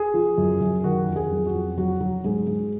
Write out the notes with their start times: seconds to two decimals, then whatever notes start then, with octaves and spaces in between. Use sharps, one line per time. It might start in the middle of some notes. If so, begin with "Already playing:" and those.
Already playing: G#4
0.14 F3
0.38 F#2
0.61 F#2
0.84 D#3 F#4
1.08 F2
1.16 G#4
1.31 F#3
1.47 F#4
1.54 F2
1.78 F#3 F#4
2.01 F#3
2.24 G#2 G#4
2.47 G#2